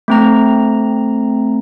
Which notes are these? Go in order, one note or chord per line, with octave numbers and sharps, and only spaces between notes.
A3 C4 A#5